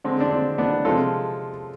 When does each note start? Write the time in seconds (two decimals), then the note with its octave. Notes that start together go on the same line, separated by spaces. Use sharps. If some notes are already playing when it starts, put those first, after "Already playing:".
0.04 D3 G#3 C4
0.20 D4
0.31 C4
0.58 B3 D4
0.85 C3 F3 G#3 F4 A4